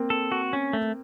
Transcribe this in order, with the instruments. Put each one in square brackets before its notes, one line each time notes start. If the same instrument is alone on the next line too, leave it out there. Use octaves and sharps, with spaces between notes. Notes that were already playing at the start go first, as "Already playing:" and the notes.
Already playing: [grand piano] A#3 C4
[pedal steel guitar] A4
F#4
C#4
A3